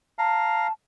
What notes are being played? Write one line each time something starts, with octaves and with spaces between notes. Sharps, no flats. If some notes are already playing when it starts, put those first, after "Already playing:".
F5 A5 A#5